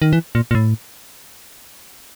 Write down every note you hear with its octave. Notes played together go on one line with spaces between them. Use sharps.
D#3
E3
A#2
A#2
A2